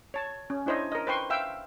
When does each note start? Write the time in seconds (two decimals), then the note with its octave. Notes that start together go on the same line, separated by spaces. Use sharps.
0.14 C#5 A5
0.50 C#4
0.66 D4 E4 C5 C#5 D#5
0.92 A#4 D#5
1.07 B4 C5 G5 C6 C#6
1.30 E5 F5 G5 E6